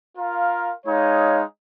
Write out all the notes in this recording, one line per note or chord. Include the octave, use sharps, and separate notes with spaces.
F4 A#4 F5
G#3 D#4 C#5 F5